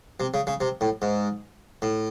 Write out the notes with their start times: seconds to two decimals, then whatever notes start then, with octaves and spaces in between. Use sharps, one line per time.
0.20 C3
0.34 C#3
0.47 C#3
0.61 C3
0.81 A2
1.02 G#2
1.82 A2